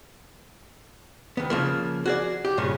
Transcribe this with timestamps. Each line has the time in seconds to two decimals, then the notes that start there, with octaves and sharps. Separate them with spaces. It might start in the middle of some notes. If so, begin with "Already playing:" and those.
1.37 D#2 B3
1.50 C#3 F3 A#3
2.06 F#4 G#4 D5
2.45 G4
2.58 G2 A#2 C#3 C#4